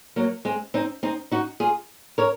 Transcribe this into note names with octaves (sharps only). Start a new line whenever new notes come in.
F#3 A#3
G#3 C4
C4 D#4
C4 D#4
D#4 F#4
F4 G#4
A#4 C#5